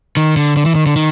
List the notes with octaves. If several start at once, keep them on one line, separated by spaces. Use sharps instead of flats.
D#3
D3
D3
E3
D#3
D3
D#3